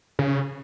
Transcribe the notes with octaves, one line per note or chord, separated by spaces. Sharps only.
C#3